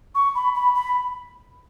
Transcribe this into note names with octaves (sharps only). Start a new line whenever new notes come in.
C#6
B5
B5
B5